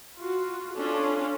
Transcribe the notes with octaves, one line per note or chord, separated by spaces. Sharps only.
F4 F#4
C#4 D4 F4 A4